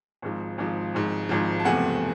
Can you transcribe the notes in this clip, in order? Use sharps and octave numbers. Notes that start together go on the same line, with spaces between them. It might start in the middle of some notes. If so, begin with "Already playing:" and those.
G#1 G#2 F3
G#1 G#2 F3
G#1 G#2 F3
G#1 G#2 F3
A5
F#1 E2 C3 F3 A3 F#5 G#5